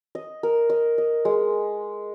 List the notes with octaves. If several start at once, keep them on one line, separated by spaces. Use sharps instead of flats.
D#5
A#4
D#5
D#5
G#3